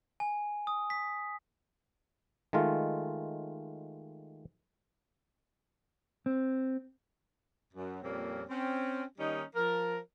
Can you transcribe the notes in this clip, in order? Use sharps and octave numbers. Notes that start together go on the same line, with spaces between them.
G#5
D#6
B6
D#3 G#3 A3 F4
C4
F#2
F2 A#2 G3 A#3 C4 C#4
C4 C#4
D#3 G3 A#3 C#4 D#4
F3 A#4